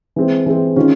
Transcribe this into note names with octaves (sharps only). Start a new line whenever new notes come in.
E3 G#3 C4
E3 G#3 C4
D#3 G#3 C#4 F4